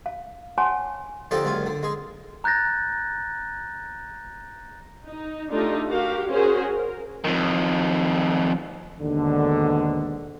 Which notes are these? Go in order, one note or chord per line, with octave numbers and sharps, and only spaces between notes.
F5
C#5 F#5 G#5 A5 C6 C#6
D2 F3 D4 D#4 G4 A4
C#2 F#2 A#2 F4
D3
G#3 G#4
A#5 F#6 G6 A6 A#6
D#4
A3 D4 D#4 F4 G4 A4
F#4 G4 A#4 F5
C#4 F#4 G#4 A#4 C5 C#5
A#4
F2 D#3
D#2 G#2 B2 D3